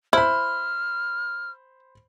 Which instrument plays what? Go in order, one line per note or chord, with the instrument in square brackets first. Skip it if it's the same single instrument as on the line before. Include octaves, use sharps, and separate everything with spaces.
[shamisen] E4 [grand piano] C5 B5 [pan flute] F6